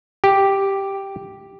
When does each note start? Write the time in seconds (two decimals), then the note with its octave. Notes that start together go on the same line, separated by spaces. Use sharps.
0.24 G4